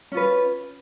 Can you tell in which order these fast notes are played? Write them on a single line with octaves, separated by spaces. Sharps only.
C#4 F4 B4